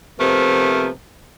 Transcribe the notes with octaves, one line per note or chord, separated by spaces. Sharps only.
C3 F3 A3 B3 A#4